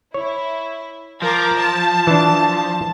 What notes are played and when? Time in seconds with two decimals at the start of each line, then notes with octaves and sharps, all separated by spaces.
0.14 E4 C#5
1.22 F3 A#4 D6
1.58 A5
2.07 E3 D4